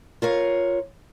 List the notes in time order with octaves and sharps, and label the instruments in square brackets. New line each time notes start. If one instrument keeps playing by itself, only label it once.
[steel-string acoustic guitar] F4 A#4 C#5